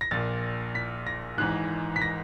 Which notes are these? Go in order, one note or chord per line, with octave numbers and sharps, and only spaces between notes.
A#6
A#1 A#2 A6
B6
A#6
G#1 G#2 E3 F#6
B6
A#6